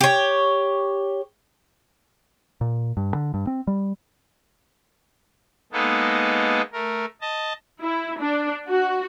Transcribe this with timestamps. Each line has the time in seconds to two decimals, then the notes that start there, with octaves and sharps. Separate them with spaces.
0.01 G4 C#5
2.61 A#2
2.97 G2
3.15 D3
3.34 G2
3.47 C4
3.67 G3
5.73 G#3 A#3 B3 D#4 A4
6.73 A3 A#4
7.21 D#5 A5
7.82 E4
8.19 D4
8.68 F#4